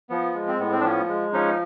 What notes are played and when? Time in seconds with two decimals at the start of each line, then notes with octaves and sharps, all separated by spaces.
0.10 F3 B3
0.34 G#3
0.47 C4
0.59 A2 B3
0.71 C4
0.80 D4
0.84 F3 B3 C#4
1.09 G#3
1.33 F3 C#4 D#4